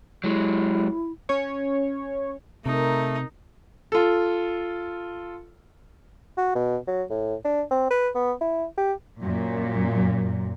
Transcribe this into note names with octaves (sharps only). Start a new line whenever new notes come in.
F#3 G#3 E4
C#4 C#5
C3 A3 D#4 A#4
F4 A4
F#4
B2
F#3
A2
D4
C4
B4
B3
E4
G4
F#2 A#2